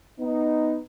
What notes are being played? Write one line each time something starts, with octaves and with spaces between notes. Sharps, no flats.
B3 D#4